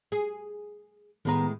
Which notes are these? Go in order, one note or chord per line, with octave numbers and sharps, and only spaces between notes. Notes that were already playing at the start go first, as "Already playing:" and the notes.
G#4
A2 D#3 G#3 B3 B4 A#5